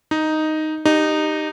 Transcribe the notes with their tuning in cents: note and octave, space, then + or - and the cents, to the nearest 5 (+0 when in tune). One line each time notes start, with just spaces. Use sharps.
D#4 +0 D#5 +0
D#4 -15 G4 +0